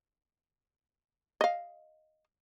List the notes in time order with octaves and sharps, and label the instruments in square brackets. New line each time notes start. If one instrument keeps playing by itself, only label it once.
[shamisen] D#5 F5